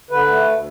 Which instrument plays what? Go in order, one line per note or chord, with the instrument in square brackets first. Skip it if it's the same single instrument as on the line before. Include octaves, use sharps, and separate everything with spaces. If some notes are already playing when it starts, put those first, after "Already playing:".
[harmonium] D3 B4
A3
D2